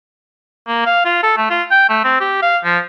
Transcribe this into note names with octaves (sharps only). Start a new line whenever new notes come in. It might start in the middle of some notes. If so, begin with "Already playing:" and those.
A#3
F5
F4
A4
A3
F4
G5
A3
C4
G4
F5
F3